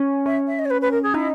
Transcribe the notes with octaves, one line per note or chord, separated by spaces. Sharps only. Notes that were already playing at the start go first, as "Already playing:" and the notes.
Already playing: C#4
C#4 E5
E5
D#5
C#5
B4
B4
A#4
G#4
D#4 E4